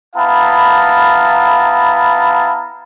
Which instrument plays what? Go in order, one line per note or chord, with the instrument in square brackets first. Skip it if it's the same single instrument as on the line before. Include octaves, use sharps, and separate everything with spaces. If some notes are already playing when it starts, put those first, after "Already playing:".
[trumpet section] B3 E4 F5 A5 A#5